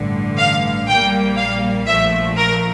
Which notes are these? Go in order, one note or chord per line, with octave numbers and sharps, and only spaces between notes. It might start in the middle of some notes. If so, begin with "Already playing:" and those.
Already playing: A1 G2 D3
F5
A#1 A#2 G3 A#3 G5
F5
A#1 A#2 F3 A3 E5
A#4